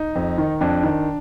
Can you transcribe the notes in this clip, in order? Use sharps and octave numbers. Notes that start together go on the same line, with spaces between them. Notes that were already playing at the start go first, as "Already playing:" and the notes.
Already playing: D#4
F2
D#3
F2 D4
D#3